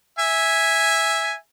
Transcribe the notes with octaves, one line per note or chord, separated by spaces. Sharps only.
E5 G#5